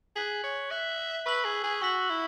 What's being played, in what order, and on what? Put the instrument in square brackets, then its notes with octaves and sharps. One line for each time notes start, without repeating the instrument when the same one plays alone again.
[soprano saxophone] G#4 [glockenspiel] F#6 B6 F#7
[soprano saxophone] C#5
[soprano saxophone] E5 [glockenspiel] F#6 B6 F#7
[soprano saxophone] B4 [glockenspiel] C#6 E6 B6 F#7
[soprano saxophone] G#4
G#4
[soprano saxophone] F#4 [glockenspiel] C#6 E6 B6 F#7
[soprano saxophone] E4